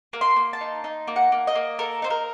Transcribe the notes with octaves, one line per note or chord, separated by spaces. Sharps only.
A#3
C6
A#3
A5
D#4
D#4
A#3
F#5
A#3
D#5
A#3
A4 A#4
D#4 C5
A#4